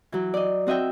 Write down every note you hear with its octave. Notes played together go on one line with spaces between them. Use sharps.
E3 F#3
D5 D#5
C4 F#4 D#5 E5 G5